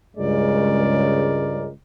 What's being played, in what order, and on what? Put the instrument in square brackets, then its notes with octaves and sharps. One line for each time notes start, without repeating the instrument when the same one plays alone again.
[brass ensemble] C#2 G2 C#3 G#3 A#4 D5